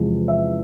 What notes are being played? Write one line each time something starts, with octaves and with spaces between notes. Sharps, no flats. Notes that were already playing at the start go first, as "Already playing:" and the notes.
Already playing: E2 C3 F3 G#3
E5